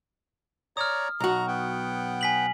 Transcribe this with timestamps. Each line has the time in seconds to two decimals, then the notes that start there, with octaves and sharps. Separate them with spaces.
0.77 C#5 D5 A#5 D#6 F6
1.20 B1 F#4 A#5
1.48 B3 F#5 G5
2.21 G#5 B6 F#7